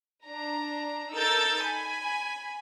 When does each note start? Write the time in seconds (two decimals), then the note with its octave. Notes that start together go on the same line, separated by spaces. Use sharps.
0.24 D4 A#5
1.13 D#4 A4 A#4 E6 G6 A6
1.63 G#5 B5